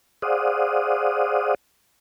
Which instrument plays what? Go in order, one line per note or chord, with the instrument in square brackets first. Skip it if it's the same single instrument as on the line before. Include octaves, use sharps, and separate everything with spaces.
[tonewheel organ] G#4 C5 D5 F5 F#5 D#6